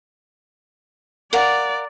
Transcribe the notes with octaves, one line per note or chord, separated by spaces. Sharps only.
A#4 D5 F5 F#5